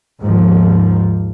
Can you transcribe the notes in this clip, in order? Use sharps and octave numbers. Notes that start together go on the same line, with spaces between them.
D#2 G#2 F3